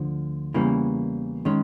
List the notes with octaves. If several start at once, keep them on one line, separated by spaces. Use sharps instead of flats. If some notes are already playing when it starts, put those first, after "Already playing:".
Already playing: D2 D3 F3
E2 C#3 E3 G3 A#3
D#3 G#3 C#4